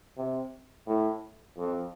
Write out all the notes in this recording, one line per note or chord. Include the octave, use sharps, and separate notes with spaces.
C3
A2
F2